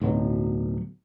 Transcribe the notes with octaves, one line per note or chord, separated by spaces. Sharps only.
D1 B1 B2 F#3